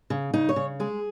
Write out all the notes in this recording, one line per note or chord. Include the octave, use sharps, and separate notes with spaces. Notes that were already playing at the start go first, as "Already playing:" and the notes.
C#3
C#3 D#4
C#5
C#3
G#3 G#4